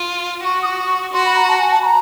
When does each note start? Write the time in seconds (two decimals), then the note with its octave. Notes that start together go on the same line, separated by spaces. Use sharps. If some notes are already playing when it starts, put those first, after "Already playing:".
Already playing: F4
0.44 F#4 C#6
0.62 D#6
0.65 C#6
1.13 F#4 C6
1.25 B5
1.36 A#5
1.47 A5
1.58 G#5
1.70 A5
1.82 B5
1.85 A#5